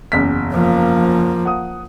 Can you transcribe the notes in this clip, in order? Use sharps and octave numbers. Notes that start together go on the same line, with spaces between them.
F#1 E2 B6
F3 A#3
F#5 D#6